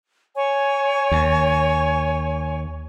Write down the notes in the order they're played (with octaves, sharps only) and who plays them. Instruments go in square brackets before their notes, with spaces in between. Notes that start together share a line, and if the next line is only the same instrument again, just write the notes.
[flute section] C#5 G#5 C#6
[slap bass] D#2